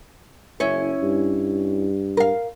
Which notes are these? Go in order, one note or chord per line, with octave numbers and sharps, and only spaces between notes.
F#1 C#4 E4 C#5
G2
A#4 F5